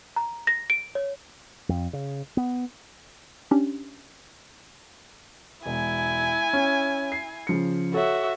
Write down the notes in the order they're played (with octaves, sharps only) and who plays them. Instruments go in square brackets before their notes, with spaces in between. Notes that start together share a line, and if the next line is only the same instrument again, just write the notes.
[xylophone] A#5
A#6
D7
C#5
[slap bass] F2
C#3
B3
[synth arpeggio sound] C#4 D4 G4
[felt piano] E1 [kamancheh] E4 G#5
[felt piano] C#4
C7
C#3 F3 C#7
[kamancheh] F#4 E5 [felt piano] A4 C#5